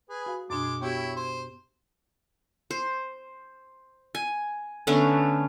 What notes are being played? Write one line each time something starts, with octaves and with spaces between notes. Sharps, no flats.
G#4 B4
F#4 F5
F#2 B2 G#3 D4 D6
B3 E4 F#4 G4 C#5 G5
C5
C5
G#5
D3 A3 B3 C#4